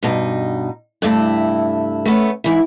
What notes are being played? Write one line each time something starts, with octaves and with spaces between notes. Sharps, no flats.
G2 B2 D#4
G2 C3 A3 E4
A3 B3 C#4
G#2 E3 E4